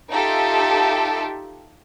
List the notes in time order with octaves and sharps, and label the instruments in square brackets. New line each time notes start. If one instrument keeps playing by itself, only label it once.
[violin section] D#4 F4 G4 A4 E5